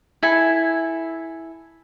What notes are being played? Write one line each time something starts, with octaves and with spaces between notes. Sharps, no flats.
E4 A4 G#5